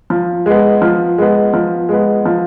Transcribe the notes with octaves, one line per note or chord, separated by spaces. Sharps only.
F3
G#3 B3
F3
G#3 B3
F3
G#3 B3
F3